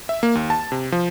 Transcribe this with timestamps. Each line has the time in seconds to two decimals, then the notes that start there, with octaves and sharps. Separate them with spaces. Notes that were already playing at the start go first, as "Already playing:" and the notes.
0.09 E5
0.23 A#3
0.35 D#2
0.50 A5
0.72 C3
0.92 F3